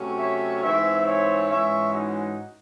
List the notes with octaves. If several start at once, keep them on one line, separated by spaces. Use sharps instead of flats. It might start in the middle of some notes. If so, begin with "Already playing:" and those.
Already playing: C3 F#3 A3 C#4
C#5 E5
G#2 E3 C4 C#5 E5
C#5 E5
G#2 E3 G#3 C#4 C#5 E5
D#4 F#4